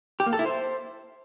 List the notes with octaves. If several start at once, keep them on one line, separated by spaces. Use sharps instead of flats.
G4
A#3
A4
E4
C5